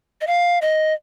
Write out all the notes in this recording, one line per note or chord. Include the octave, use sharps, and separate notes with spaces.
D#5
F5
D#5